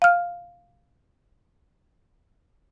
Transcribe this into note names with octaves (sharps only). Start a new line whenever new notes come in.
F5 F6